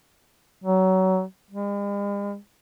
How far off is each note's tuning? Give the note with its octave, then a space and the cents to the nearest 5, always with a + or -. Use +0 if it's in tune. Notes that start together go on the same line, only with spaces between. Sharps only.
F#3 +25
G#3 -45